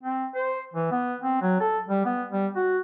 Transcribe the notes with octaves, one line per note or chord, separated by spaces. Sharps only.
C4
C5
E3
B3
C4
F#3
A4
G3
B3
G3
F#4